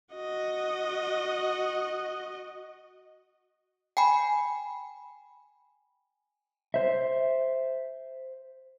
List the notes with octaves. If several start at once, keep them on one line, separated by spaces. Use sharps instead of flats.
F#4 D#5
G5 G#5 B5
C5 E5